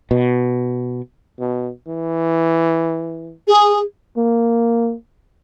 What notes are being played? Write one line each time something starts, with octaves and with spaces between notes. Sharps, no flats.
B2
B2
E3
G#4
A#3